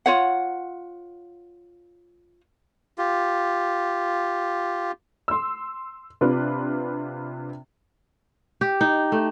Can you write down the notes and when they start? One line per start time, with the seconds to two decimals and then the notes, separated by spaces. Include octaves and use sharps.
0.06 F4 C#5 F#5
2.98 F4 G4
5.28 C6 E6
6.21 C3 D4 F4 B4
8.61 G4
8.81 D#4
9.12 A3